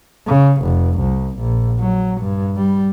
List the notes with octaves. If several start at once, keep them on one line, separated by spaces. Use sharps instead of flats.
C#3
F1
C2
A#1
F#3
G2
G3